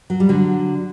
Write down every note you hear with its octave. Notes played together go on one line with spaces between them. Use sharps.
F#3
G3
D3 F#3